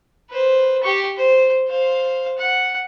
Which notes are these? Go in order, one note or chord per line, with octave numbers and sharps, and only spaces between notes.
B4 C5
G4 C#6
C5
C5 F5
F#5